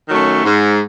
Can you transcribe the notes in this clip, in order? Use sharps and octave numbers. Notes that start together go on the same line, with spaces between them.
D#3 F#3 A3 C#4
G#2